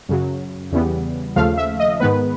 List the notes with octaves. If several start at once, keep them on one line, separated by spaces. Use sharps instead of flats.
F#2 C#3 F#3
E2 C#3 E3 G3 B3
D#2 C#3 F3 A3 F5
E5
D#5
G#2 D#3 G#3 B3 B4